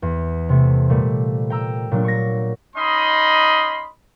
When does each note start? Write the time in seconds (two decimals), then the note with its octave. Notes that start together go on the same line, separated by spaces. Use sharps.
0.02 E2
0.49 C3 A3
0.89 A#2 G3 A3
1.50 G5 A#5 E6
1.91 A#2 F#3 D4
2.04 C#6 A#6
2.75 C#4 D#4 D#5 B5 C6